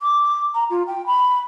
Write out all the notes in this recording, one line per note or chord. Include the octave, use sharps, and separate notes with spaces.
D6
A#5
F4
G5
B5